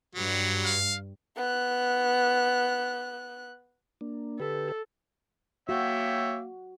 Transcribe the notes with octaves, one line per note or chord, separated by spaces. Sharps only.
G2 F#3 G3
F5
B3 F#6
A#3 D4
D3 G4 A4 B4
A#3 F#4 C#5 E5 G5